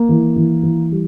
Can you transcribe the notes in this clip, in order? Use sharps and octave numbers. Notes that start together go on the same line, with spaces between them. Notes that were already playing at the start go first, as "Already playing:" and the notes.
Already playing: A#3
E3
E3
E3
G3